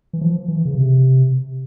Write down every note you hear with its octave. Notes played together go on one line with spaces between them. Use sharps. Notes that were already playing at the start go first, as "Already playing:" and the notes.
E3
F3
E3
C#3
C3